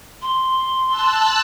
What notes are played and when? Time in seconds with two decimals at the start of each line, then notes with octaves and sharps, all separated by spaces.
0.22 C6
0.88 A5 E6 F#6